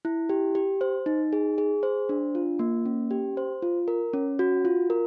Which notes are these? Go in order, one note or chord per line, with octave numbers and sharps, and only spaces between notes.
E4
G4
G4
C5
D#4
G#4
G#4
C5
D4
F4
A#3
C#4
G4
C5
F4
A#4
C#4
F#4
F4
A#4